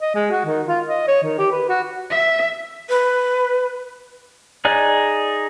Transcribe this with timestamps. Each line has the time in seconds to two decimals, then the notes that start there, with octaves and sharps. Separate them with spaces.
0.01 D#5
0.15 G#3
0.31 F#4
0.46 D#3
0.67 F4
0.87 D#5
1.08 C#5
1.23 D#3
1.38 G4
1.51 B4
1.69 F#4
2.11 E5
2.89 B4
4.65 D#4 G#4 D5 F#6